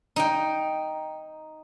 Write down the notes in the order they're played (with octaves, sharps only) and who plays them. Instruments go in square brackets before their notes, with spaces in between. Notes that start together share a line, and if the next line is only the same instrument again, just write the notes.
[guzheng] D#4 G5